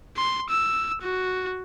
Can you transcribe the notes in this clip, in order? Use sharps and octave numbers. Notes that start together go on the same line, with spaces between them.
C6
E6
F#4